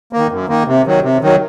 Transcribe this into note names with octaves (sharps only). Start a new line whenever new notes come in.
D#3 A#3
F#2
D#3 A#3
C3
D#3 F#3
C3
D#3 F#3